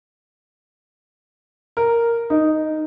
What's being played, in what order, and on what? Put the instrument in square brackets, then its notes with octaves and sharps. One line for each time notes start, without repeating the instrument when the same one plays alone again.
[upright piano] A#4
D#4